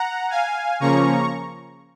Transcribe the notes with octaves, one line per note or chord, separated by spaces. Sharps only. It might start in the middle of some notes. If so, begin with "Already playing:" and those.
Already playing: F#5 A#5
F5 G#5
C#3 F3 A#3 C#4 A#5 C#6